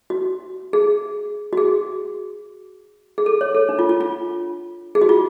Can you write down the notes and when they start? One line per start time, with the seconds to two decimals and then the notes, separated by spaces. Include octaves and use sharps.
0.10 F#4
0.73 G#4
1.53 F#4
1.57 G#4
3.18 G#4
3.26 A4
3.41 C#5
3.55 A4
3.69 D4
3.79 F4
3.89 F4
4.01 F4
4.95 G#4
5.01 F#4
5.09 F4